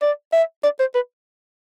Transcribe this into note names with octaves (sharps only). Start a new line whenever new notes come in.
D5
E5
D5
C5
B4